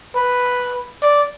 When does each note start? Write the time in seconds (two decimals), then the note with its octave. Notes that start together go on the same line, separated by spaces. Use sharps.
0.16 B4
1.02 D5